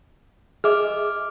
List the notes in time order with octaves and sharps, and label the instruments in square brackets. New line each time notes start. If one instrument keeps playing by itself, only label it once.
[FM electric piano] G#4 E5 [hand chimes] D#5 D6 F6